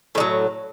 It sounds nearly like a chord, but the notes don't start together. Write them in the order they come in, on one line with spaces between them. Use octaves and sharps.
A2 G#3 F#3